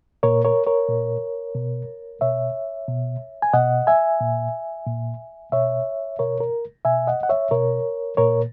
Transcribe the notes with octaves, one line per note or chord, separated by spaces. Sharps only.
A#2 A#4 C#5
A#4 C#5
A#4 C#5
A#2
B2
B2 C#5 E5
B2
G#5
B2 D#5 F#5
E5 G#5
A#2
A#2
B2 C#5 E5
B2 A#4 C#5
A#4
B2 E5 G#5
D#5 F#5
F#5
C#5 E5
B2 A#4 C#5
A#2 A#4 C#5